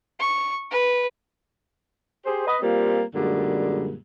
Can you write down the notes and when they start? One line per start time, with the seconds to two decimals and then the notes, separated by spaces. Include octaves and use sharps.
0.19 C#6
0.71 B4
2.25 G4 G#4 C5
2.47 B4 D#5
2.62 G3 A#3 C4 F4
3.15 F#2 A#2 D3 G3 G#3